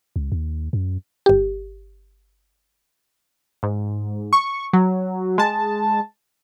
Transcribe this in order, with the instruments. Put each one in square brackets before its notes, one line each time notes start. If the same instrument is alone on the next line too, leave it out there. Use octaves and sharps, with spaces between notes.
[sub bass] C#2
D#2
F#2
[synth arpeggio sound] G1 G4
G#2
C#6
F#3
G#3 A5